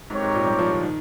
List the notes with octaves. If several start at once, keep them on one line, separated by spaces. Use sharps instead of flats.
G#2 C4 G4 A#4 C#5
G#2
A#2
G3
F3
D#3
D#3